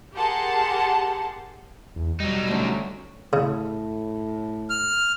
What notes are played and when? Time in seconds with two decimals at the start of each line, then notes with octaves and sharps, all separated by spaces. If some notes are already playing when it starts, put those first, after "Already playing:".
0.15 G4 G#4 A#4 F#5 A5 C6
1.96 E2
2.20 F#3 G3 D#4
2.48 D2 C#4
3.33 A2 C#3
4.70 F6